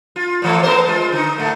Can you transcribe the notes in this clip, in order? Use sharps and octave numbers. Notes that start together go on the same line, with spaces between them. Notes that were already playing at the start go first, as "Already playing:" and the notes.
F4
A#2 E3 A3
B3 A#4 C5
G#3 F4
D3 D#4
A2 A3